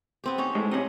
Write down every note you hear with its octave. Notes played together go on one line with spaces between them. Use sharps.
B3 C4 G4
C#4 D#4 C#5
A2 G#3
C3 C4 C#4 D#5 F#5